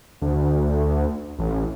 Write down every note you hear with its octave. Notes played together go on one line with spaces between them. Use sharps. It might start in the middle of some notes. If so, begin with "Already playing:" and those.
D2
A1